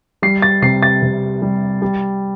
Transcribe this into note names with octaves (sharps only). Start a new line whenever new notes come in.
G3 C7
A6
C3 C7
A6
C3
G3
G3